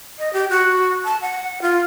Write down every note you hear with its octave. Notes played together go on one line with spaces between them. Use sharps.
D#5
G4
F#4
A5
F#5
F4